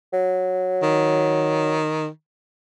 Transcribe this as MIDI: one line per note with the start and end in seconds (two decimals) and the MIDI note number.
0.13 1.81 54
0.82 2.08 51